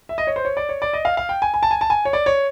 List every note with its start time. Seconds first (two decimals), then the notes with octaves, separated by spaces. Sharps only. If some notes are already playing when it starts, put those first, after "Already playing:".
0.09 E5
0.18 D#5
0.27 C#5
0.36 C5
0.45 C#5
0.57 D5
0.69 C#5
0.82 D5
0.93 D#5
1.05 F5
1.17 F5
1.29 G5
1.42 G#5
1.54 G#5
1.63 A5
1.71 G#5
1.81 A5
1.90 G#5
2.05 C#5
2.13 D5
2.26 C#5